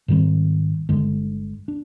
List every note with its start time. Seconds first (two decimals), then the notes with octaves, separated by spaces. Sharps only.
0.08 G#2 D#3 G3 C4
0.89 G1 G2 D3 G#3
1.68 D4